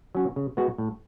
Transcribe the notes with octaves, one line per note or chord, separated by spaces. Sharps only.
F#3 C#4 F#4
C#3
G#3 B3 F#4
A2